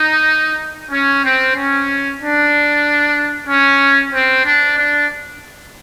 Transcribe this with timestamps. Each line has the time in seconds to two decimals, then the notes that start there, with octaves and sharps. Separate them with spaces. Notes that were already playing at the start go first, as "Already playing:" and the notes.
Already playing: D#4
0.91 C#4
1.23 C4
1.55 C#4
2.20 D4
3.48 C#4
4.12 C4
4.45 D4
4.76 D4